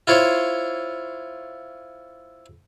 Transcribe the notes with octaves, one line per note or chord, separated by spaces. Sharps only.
E4 F4 C5 C#5